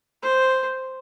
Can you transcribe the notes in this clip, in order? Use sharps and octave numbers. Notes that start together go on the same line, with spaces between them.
C5